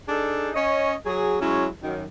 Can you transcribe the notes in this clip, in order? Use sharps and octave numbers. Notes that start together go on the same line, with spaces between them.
D4 D#4 G#4 A4
C#4 D#5
F#3 G#4
F#3 G#3 C#4 E4
F#2 D#3